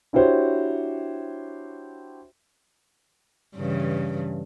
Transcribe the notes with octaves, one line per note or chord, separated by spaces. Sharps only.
D4 E4 F#4 G4 C5 C#5
G2 C#3 E3